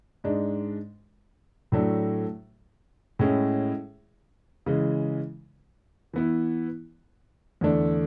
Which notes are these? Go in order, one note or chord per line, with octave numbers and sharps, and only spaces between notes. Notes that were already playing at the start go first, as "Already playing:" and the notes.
G#2 G#3 D4
A2 F#3 A3 D4
A2 G#3 C#4 E4 G#4
C#3 E3 G#3
E3 B3 E4
E2 D3 A3 D4